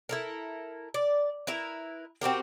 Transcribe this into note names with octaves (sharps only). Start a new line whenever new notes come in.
E4 A4 A#4
D5
E4 A#4 B4
C4 F#4 G4 A#4